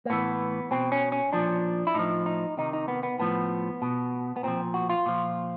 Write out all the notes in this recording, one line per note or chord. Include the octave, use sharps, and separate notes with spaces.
A#3
A2 E3 B3
B2 C4
C#4
C#4
A#2 F3 D4
E4
A2 F3 D#4
D#4
C3 D#3 D#4
D#4
B3
B3
A2 F3 B3
B2
B3
A#2 F3 C4
F#4
F4
A#2 F3